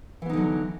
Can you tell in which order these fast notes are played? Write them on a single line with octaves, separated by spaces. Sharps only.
E3 B3 D#4 D3 F#3